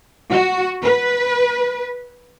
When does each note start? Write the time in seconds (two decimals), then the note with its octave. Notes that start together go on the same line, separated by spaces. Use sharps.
0.31 F#4
0.82 B4